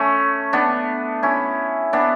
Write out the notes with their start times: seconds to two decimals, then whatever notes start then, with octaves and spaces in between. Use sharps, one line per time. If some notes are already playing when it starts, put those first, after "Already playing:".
Already playing: A3 C#4
0.53 B3 D4
1.23 C#4 E4
1.93 B3 D4